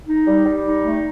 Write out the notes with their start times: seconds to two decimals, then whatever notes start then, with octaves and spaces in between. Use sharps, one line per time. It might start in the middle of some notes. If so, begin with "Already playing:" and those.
0.07 D#4
0.26 G3
0.46 G3
0.65 D#4
0.84 A3